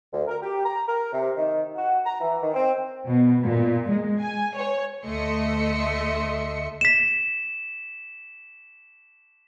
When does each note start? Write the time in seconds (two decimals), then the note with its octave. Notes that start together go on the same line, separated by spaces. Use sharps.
0.12 D2
0.27 A#4
0.42 G4
0.64 A#5
0.87 A#4
1.13 C3
1.37 D#3
1.76 F#4
2.05 A#5
2.21 E3
2.42 D#3
2.54 C4
3.06 B2
3.42 A#2
3.88 G#3
4.19 G#5
4.56 C#5
5.06 D2 A3 D#5 E5 C6 C#7
6.81 B6 E7